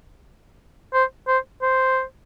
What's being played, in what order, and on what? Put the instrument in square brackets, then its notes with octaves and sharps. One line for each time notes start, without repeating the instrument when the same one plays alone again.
[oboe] C5
C5
C5